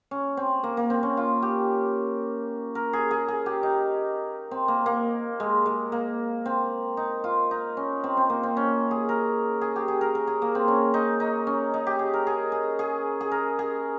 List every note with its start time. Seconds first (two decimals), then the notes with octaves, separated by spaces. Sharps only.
0.11 C#4
0.37 C4
0.63 A#3
0.77 A#3
0.90 C4
1.03 C#4
1.17 F4
1.42 G4
2.75 A#4
2.93 G#4
3.11 G#4
3.28 G#4
3.46 G4
3.63 D#4
4.51 C4
4.68 A#3
4.86 A#3
5.40 G#3
5.66 G#3
5.92 A#3
6.46 C4
6.97 D#4
7.24 F4
7.51 D#4
7.77 C#4
8.04 C4
8.17 C4
8.30 A#3
8.43 C4
8.57 C#4
8.91 G#4
9.09 A#4
9.61 G#4
9.76 G4
9.88 G#4
10.01 A#4
10.15 A#4
10.27 G#4
10.42 A#3
10.55 C4
10.68 C#4
10.94 D#4
11.20 D#4
11.47 C#4
11.74 D#4
11.87 G4
11.99 G#4
12.14 A#4
12.27 G#4
12.52 G#4
12.79 G#4
13.21 G#4
13.31 A#4
13.59 G#4